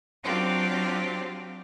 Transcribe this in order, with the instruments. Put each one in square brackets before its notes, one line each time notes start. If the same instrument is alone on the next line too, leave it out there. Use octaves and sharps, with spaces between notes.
[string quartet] F#3 C4 D4 F4 G4